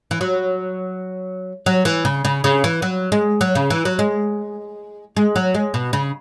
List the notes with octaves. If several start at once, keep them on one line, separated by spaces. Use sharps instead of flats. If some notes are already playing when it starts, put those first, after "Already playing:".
E3
F#3
F#3
E3
C#3
C#3
C#3
E3
F#3
G#3
F#3
C#3
E3
F#3
G#3
G#3
F#3
G#3
B2
C#3